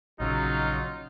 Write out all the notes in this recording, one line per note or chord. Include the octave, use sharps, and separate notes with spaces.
A#1 C#3 F#3 D#4 F4